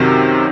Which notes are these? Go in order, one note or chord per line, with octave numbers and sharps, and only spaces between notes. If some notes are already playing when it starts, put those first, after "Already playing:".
Already playing: F#2 C3 D#3 F#3 C4